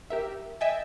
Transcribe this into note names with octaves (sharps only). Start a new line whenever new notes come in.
G4 A#4 E5
D#5 E5 G5 G#5 G6 A6